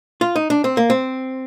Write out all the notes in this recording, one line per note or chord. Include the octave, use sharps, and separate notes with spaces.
F4
D#4
D4
C4
A#3
C4